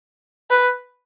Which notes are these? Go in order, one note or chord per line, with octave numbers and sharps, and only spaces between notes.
B4